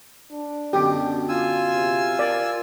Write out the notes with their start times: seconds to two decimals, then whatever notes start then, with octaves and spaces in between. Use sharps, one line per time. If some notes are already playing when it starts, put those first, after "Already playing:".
0.32 D4
0.73 F#2 B2 D3 G4
1.29 F4 G#5 E6
1.73 C3
2.19 A#4 D5